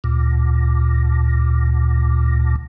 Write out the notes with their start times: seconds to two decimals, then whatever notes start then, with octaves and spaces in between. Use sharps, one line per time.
0.04 D2 A#2